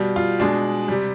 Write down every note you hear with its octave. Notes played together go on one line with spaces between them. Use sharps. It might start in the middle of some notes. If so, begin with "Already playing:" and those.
Already playing: B2 G3
F4
B2 G#3 D4
C3 G3